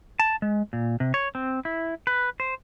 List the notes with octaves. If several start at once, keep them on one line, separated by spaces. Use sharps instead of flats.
A5
G#3
A#2
C3
C#5
C4
E4
B4
C5